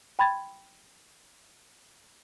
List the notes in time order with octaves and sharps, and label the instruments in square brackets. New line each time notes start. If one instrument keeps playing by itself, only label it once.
[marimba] G5 B5 C6 G#6 A6